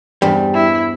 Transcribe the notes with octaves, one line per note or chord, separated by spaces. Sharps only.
E2 G2 G3 C5
E4